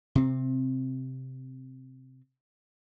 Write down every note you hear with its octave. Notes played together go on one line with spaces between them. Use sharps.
C3 C4